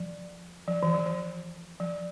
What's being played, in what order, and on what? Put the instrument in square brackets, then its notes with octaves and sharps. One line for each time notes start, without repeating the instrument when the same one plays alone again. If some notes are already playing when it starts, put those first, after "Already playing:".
Already playing: [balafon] F3
F3
E3
F3
E3
F3